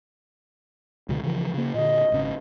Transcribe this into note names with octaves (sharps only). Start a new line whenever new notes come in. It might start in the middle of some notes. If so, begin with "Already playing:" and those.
C#2 B2 D3
C#3 E3 F3
C#3 A#3
A#2 D3 D#5
G#1 C#3